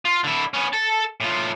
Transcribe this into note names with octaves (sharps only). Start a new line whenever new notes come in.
F4
D3 E4
B3 C#4
A4 A5
A2 F4